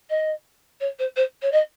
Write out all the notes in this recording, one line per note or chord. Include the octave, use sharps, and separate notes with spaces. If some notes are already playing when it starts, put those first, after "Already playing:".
D#5
C#5
C5
C5
C#5
D#5